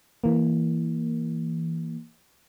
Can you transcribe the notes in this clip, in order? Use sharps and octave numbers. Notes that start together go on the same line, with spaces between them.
E3 A#3